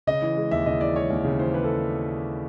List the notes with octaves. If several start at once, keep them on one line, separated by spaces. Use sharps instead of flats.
C#3 D#5
E3
G#3
D#2 E5
C#3 D#5
E3 D5
G#3 C#5
D#2
C#3
E3 C5
G#3 B4
A4